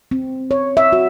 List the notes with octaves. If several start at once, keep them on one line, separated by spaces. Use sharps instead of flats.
C4
C#5
E5
F#4